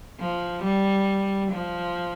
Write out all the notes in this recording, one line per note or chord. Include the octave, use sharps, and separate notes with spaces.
F3
G3
F3